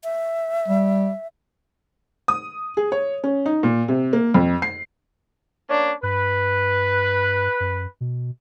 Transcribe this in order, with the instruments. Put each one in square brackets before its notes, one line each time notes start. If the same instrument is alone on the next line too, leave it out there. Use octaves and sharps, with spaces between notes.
[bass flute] E5
[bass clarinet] G3
[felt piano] D#6
G#4
C#5
C#4
D#4
A#2
C3
A#3
F2
C7
[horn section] A#3 C#4 D4
[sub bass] G2 [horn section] B4
[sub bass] F#2
B2